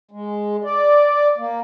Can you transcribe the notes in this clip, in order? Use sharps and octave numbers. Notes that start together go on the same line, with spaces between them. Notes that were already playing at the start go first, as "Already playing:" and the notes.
G#3
D5
A#3